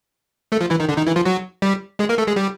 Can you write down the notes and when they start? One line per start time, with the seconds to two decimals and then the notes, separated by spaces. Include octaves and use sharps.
0.52 A3 A4
0.60 F3 F4
0.70 E3 E4
0.80 D#3 D#4
0.89 D3 D4
0.97 D#3 D#4
1.07 E3 E4
1.16 F3 F4
1.25 F#3 F#4
1.62 G3 G4
1.99 G#3 G#4
2.09 A#3 A#4
2.18 A3 A4
2.27 G#3 G#4
2.36 G3 G4